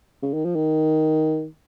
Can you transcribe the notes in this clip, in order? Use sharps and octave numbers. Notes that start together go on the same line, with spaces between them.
C#3
D#3
F3
D#3